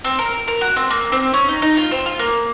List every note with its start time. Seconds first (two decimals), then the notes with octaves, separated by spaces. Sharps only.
0.04 C4
0.19 A#4
0.48 A#4
0.61 F#4
0.76 C4
0.90 A#3
1.12 C4
1.34 C#4
1.48 D#4
1.62 D#4
1.77 F4
1.91 C4
2.06 F4
2.19 A#3